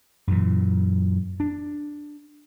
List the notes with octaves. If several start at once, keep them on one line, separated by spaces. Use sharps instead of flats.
F#2 A#2 E3
D4